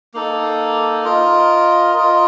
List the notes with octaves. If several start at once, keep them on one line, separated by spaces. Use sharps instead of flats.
A#3 D#4 A4
F4 A#4 D#5
F4 A#4 D#5